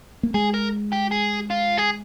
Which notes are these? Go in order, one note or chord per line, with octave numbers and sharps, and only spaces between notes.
A#3
G#3 G#4
A#4
G4
G#4
F4
G#4